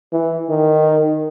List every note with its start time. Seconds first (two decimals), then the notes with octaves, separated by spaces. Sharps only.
0.12 E3
0.50 D#3